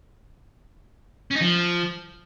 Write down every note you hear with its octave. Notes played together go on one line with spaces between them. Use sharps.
C#4
D#4
F3